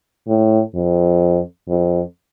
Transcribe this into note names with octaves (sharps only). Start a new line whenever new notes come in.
A2
F2
F2